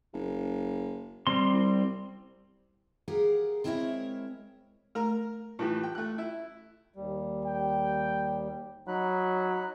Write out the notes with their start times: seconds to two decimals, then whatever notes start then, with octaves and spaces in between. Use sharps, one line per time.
0.13 F#1
1.27 G3 C4 C6
1.54 C2
3.08 G4 G#4 A#4 F5 F#5
3.64 G#3 C4 E4 A#4 C#5 E5
4.95 A3 A#4 A#5
5.59 A2 E3 F4 G4
5.83 G5
5.95 A3 F#6
6.18 E4
6.96 D#2 G3
7.46 G5
8.88 F#3 D#4 B5 F#6